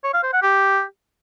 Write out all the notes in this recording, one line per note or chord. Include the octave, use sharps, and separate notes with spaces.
C#5
F5
C5
F#5
G4